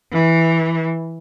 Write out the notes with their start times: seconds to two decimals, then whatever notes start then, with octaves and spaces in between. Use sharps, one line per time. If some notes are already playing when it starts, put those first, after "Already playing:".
0.12 E3